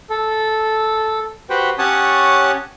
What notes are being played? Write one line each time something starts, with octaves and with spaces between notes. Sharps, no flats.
A4
F#4 G4 B4 C5 F#5 G5
C#4 G4 C#5 F#5 A5 D#6